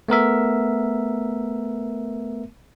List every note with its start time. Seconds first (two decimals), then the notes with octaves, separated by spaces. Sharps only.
0.08 A3 B3 A#4 E5